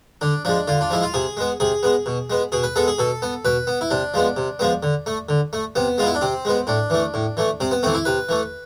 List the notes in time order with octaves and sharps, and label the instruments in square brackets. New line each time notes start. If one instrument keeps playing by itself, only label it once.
[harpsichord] D3 D4
F3 G#3 D4
D3 F4
D4
F3 G#3 E4
F4
C3 G#4
G#3 B3
C3 G#4
G#3 B3
B2
G#3 B3
B2 G#4
B4
G#3 B3 A4
G#4
B2 A4
B3
B2 B4
B3
E4
C3 D4
F3 G#3 B3
C3
F3 G#3 B3
D3
A3
D3
A3
C3 B3
G#3 F4
B3 E4
D4
C3 C4
G#3 B3
A2 D4
E3 A3
A2
E3 A3
C3 C4
B3
E3 A3 C4
E4
C3 B4
E3 A3